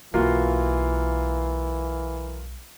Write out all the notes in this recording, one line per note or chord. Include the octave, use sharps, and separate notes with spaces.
B1 E3 A#3 F4 F#4